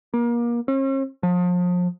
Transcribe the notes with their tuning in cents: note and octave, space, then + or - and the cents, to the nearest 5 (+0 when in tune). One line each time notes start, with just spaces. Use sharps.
A#3 +30
C#4 -45
F3 +35